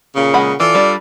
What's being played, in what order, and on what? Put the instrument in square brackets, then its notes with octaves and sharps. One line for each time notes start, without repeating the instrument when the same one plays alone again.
[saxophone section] A#2 C#3
[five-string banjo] G#3 F#5 B5
[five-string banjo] E3 [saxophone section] F4 A4 D5
[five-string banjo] G3 D4